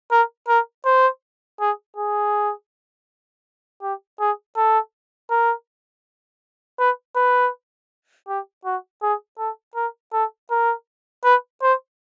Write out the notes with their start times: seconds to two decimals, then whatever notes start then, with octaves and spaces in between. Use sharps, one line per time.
0.11 A#4
0.48 A#4
0.85 C5
1.60 G#4
1.97 G#4
3.82 G4
4.20 G#4
4.57 A4
5.30 A#4
6.79 B4
7.16 B4
8.28 G4
8.65 F#4
9.02 G#4
9.38 A4
9.75 A#4
10.13 A4
10.51 A#4
11.24 B4
11.62 C5